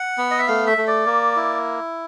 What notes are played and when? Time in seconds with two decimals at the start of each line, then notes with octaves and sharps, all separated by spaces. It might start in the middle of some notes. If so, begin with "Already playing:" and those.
Already playing: F#5
0.18 B3
0.31 D#5
0.38 E5
0.47 A3 F5
0.67 E5
0.78 A3
0.87 D5
1.06 A#3
1.36 E4